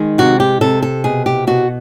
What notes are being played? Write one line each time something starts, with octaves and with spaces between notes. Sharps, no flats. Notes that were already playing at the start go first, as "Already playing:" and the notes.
Already playing: D#3 G#3
C3 F#4
G4
C3 A4
A4
B2 G#4
G4
B2 F#4